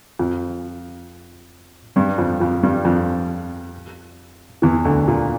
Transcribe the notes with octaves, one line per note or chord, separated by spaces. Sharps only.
F2 F3
G2 G3
F2 F3
F2 F3
G2 G3
F2 F3
E2 E3
D2 D3
A#2